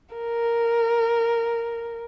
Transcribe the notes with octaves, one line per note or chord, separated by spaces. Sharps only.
A#4